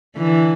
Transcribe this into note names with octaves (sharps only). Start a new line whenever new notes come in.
D3 E3